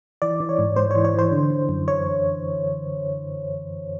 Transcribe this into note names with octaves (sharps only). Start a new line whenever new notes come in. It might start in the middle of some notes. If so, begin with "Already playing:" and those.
E3 D5
E3
C#5
G#2
G#2 C5
E3 C#5
C#5
E3 C5
D3
D3
F#2
C#5